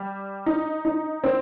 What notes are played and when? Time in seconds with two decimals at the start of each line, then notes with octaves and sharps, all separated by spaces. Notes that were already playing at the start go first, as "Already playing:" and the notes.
Already playing: G3
0.46 D#4
0.85 D#4
1.24 C4